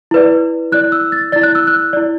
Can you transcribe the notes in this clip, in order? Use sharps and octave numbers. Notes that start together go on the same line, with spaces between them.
E4 B4 D5
E4 D5 F#6
E6
A6
E4 D5 A6
F#6
E6
F#6
E4 D5